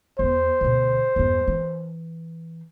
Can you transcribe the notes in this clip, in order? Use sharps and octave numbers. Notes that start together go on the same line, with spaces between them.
E2 B3 C5
D2 B2
E2 G2
E3 C4